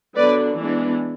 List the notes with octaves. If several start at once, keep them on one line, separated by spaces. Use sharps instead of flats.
D3 F#3 B3 D4 B4 D5
E3 G#3 B3 D4